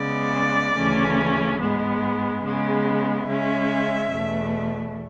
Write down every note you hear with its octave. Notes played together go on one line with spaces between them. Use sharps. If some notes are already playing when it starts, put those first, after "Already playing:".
Already playing: C#3 G#3 B3 D5
D2 C#3 E3 A3 C#4
G#2 G#3 B3
C#3 G#3 B3
C#3 G#3 C#4 E5
E2 B2 A3